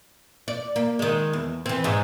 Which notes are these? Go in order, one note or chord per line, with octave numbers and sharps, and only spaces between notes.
D5
A#3
D#3 G#3
E2
E3 C4
G#2 G#3